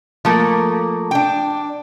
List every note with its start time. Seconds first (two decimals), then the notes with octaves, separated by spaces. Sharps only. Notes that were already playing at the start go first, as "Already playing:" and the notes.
0.25 F3 A3 A#3
1.11 D4 G5